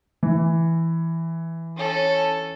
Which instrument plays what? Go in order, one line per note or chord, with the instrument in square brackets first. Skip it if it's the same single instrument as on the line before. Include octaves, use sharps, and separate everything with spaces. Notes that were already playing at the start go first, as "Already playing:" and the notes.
[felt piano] E3
[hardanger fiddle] C#4 A4